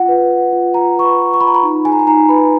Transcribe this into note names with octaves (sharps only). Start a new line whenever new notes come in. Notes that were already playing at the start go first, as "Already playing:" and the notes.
Already playing: F4 F#5
B4
B4
F4
F4 A#5
B4 C#6
B5
B4
C#6
F4 B5
A#5
B5
D#4
G#4 G#5
A#5
G#5
D#4 A#5
B4 B5